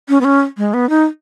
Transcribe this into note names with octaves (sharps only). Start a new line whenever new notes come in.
C#4
B3
C#4
G#3
B3
D#4